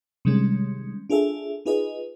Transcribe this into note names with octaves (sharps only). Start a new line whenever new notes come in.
C3 D#3 G3 G#3 C#4
D4 F4 G#4 A4 E5
D#4 F4 G#4 B4 D#5